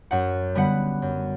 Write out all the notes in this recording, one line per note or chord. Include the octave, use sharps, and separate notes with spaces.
F#2 F#5
D3 G3 B3 F#5
F#2